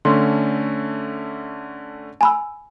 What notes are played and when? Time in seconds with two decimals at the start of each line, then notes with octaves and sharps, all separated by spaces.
0.05 D3 A3 C#4 C6
2.21 G#5 B5 E6